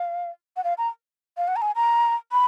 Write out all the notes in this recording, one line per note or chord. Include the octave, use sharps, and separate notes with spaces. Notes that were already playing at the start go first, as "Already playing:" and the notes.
Already playing: F5
F#5
F5
A#5
F5
F#5
A#5
G#5
A#5
B5